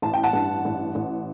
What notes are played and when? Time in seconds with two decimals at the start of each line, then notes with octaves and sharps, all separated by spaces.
0.02 A1 A5
0.14 G5
0.23 F#5 A5
0.33 G2
0.65 A1
0.95 A1